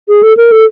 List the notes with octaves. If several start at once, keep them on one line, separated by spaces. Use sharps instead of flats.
G#4
A4
A#4
A4